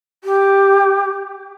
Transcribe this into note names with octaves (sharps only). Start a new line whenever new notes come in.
G4